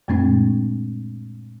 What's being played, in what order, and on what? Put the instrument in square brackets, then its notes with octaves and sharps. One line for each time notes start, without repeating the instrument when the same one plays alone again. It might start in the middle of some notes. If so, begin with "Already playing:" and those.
[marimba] F#2 A#2 G#3 A3 C4 D4